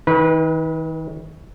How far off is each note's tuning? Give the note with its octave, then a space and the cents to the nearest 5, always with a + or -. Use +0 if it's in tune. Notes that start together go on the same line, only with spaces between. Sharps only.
D#3 +40 B4 -20